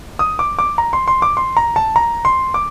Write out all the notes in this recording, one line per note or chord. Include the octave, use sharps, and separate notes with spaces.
D#6
D6
D6
A#5
C6
C6
D6
C6
A#5
A5
A#5
C6
D6